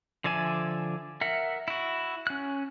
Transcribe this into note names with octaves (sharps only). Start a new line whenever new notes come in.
D3 F3 D5 E5 G#5
A#4 E5 F#5
E4 F#4
C#4 F#6